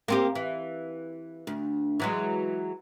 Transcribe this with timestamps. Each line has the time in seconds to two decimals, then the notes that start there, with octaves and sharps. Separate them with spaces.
0.08 A#3 C4 G4
0.35 E3
1.47 D2
2.00 E3 F#3 G#3